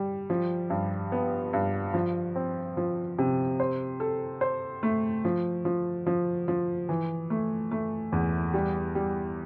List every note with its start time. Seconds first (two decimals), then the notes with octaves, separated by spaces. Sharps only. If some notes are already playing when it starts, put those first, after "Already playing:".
Already playing: G3
0.30 F3
0.70 G2
1.12 B3
1.53 G2
1.94 F3
2.36 C4
2.77 F3
3.19 C3
3.60 C5
4.00 A4
4.41 C5
4.83 A3
5.25 F3
5.65 F3
6.06 F3
6.48 F3
6.89 E3
7.30 A3
7.71 A3
8.12 E2
8.54 G3
8.95 G3